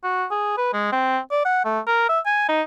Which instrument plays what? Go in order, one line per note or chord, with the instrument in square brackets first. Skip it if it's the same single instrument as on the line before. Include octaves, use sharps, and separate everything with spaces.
[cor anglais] F#4
G#4
B4
G#3
C4
D5
F#5
A3
A#4
E5
G#5
D#4